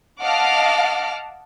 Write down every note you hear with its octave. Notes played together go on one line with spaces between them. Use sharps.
D#5 F5 F#5 A5 D6 F6